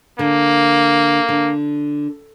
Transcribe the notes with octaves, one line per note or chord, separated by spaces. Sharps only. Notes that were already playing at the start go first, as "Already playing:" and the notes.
D3 A#3
D3